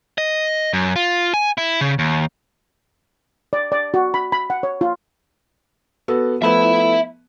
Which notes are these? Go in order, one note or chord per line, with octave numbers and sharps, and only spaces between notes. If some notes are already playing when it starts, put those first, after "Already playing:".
D#5
F#2
F4
G#5
E4
C#3
D#2
D5
D5
F#4
B5
B5
F#5
C#5
F4
B3 F#4 A4
F3 A3 B3 E5 B5